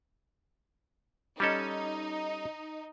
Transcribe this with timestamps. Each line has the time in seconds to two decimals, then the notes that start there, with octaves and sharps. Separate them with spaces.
1.40 G3 C#4 D#4 A4